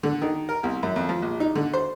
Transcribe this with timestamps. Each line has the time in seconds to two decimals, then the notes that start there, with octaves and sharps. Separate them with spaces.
0.03 D3
0.22 D#3
0.49 A#4
0.63 C2
0.83 F#2
0.96 F2
1.09 F3
1.22 A#1
1.40 D#4
1.56 D3
1.73 C5